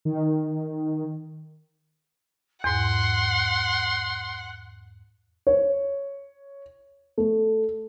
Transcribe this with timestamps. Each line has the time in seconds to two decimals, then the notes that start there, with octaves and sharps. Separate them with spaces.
0.05 D#3
2.64 E2 G#2 F#5 C6
5.47 C#5
7.18 A3